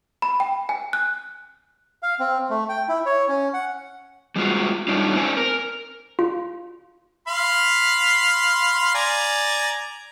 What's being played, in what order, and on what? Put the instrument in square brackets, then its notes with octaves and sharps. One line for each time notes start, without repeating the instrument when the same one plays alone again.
[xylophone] B5
G5
G#5
F#6
[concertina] F5
C4
A3
G5
E4
C#5
C#4
F#5
[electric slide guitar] G3 G#3 F4 F#4
G#2 F#3 G3 D4 D#4 F4
C4 C5 D5 G#5
A#4
[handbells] F4
[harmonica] F5 B5 C6
D5 G#5 A#5